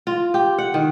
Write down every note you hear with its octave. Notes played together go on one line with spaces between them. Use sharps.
F4
G4
F#5
D#3